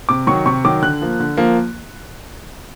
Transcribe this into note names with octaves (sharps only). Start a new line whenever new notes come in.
C3 D6
D#3 F#3 C#6
C3 C#6
D#3 F#3 D6
D3 F#6
F3 A#3
D3
F3 A#3